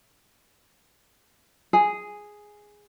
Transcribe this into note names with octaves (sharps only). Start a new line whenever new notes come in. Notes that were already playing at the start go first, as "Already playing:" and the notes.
G#4